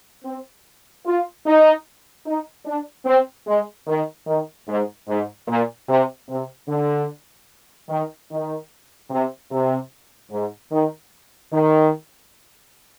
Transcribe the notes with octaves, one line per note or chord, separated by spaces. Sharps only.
C4
F4
D#4
D#4
D4
C4
G#3
D#3
D#3
G#2
G#2
A#2
C3
C3
D3
D#3
D#3
C3
C3
G#2
D#3
D#3